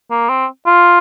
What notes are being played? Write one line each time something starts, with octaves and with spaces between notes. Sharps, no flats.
A#3
C4
F4